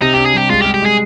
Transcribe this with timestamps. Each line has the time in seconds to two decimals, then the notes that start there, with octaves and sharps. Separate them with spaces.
0.01 C3 D#4
0.14 D4 G4
0.26 G#4
0.34 G3 G4
0.50 G#3 F4
0.62 G4
0.66 G#3
0.74 G4
0.82 G#3 G#4